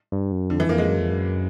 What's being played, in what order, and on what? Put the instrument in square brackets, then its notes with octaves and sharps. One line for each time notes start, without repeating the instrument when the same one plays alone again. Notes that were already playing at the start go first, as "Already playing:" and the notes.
[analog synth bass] G2
F#2
[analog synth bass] F2 [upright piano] D3
[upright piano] E3
[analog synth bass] F2 [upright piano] A#3
[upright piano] G#3
[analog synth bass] F#2
F2
F#2